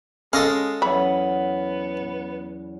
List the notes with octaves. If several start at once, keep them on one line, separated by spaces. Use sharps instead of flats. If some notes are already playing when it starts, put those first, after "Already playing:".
G#3 C#4 A4 D#5 F5
E2 F#3 B3 C#4 E5 B5